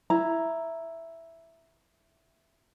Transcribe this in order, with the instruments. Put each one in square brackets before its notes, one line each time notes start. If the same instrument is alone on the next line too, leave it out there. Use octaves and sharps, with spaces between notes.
[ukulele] E4 A#5